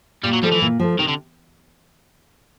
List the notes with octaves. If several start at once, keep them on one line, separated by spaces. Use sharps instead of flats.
A#2 G3
F#3
F3 G3 A3
E3
A#2
F3 A3
C3 D#3
D3